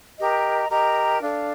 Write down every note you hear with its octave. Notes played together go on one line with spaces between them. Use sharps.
G4 A#4 D#5 A#5
G4 A#4 D#5 A#5
D4 A4 D5 F5